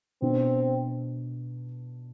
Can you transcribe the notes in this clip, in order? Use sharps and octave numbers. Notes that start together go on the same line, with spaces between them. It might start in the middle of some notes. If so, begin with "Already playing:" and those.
B2 B3 C4 D4